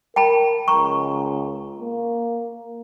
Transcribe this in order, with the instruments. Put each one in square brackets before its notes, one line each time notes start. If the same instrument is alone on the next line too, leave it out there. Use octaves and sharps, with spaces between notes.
[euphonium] A#4 [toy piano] G5 A5 B5
[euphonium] C#2 [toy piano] A#5 C#6
[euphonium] A#3